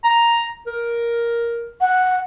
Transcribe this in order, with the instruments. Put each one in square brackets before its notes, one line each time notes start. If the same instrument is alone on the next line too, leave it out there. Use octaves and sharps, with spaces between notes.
[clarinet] A#5
A#4
[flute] F#5